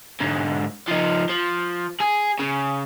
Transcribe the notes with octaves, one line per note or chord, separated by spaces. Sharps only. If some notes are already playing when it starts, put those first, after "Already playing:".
G#2 D3
F3 D#4
F3
G#4
C#3